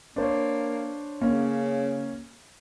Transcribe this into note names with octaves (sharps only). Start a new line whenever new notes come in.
A#3 D4 C5 C#5
C#3 A#3 C#4